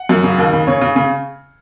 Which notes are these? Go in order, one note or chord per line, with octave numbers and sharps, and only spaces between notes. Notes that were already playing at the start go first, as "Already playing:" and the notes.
Already playing: F#5
F#2
C#3
D#2
C#3
C#3 C#5
C#3
C#3